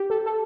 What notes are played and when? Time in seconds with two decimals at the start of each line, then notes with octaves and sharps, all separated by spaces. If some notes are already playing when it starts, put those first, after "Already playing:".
Already playing: G4
0.10 A4
0.26 A4